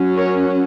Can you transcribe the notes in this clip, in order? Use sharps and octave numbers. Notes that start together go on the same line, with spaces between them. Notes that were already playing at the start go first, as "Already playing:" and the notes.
Already playing: F#3 C#4
A#4 C#5